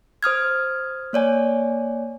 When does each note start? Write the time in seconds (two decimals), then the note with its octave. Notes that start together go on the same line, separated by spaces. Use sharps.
0.23 C5 D#6 F6 G#6
1.13 A#3 C#5 D5 G#5